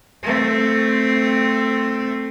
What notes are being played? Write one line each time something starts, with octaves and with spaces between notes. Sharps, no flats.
A3 C4